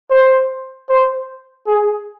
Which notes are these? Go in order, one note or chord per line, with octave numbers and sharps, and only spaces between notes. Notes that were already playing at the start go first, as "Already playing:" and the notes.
C5
C5
G#4